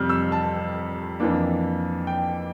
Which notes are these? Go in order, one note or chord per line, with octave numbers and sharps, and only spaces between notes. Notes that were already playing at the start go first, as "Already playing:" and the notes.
Already playing: F2 C3 G3 F6 G6
E6
A5
F2 E3 A#3 D4
G5